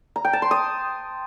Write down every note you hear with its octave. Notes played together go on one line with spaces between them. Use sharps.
A#5
G5
A5
C6
D#6